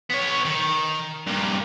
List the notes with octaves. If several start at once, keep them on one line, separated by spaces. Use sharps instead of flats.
B3 C#5
D#3
G2 A#2